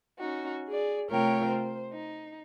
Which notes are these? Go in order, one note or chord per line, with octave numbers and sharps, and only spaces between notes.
C#4 D#4 F#4
G#4 D5
C3 A3 F4 A#4 C#5 G5
C5
D#4